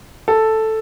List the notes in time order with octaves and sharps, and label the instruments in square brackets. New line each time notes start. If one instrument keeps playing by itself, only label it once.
[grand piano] A4